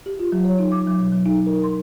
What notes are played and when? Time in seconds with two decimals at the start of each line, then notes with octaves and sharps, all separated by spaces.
0.06 G4
0.19 F4
0.32 F#3
0.45 C#5
0.59 D#4
0.72 D6
0.87 F#3
0.99 B2
1.12 F#3
1.26 D#4
1.46 A#4
1.64 C6